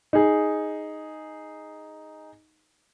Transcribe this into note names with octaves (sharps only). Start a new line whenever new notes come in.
D#4 G#4